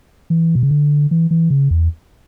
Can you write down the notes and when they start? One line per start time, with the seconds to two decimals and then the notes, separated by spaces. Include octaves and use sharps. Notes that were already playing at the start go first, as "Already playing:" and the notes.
0.30 E3
0.55 B2
0.63 C#3
0.71 D3
1.11 E3
1.31 E3
1.50 C#3
1.71 E2